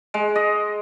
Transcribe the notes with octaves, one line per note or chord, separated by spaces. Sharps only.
G#3
D#5